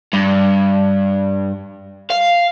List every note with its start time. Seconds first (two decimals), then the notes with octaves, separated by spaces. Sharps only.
0.13 G2
2.10 F5